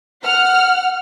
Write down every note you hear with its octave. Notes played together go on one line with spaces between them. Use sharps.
F#5 F6